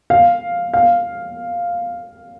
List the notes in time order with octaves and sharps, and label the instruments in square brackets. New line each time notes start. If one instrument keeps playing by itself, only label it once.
[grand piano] F5
F5